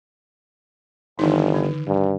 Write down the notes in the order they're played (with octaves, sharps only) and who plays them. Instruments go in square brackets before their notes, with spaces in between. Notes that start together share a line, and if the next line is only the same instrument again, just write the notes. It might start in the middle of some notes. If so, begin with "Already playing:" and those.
[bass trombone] G1 [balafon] D#3 E3 D#4
[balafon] D3
[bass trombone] G2